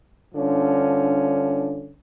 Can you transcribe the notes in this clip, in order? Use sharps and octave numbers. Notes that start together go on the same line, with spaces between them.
G2 D3 F3 C#4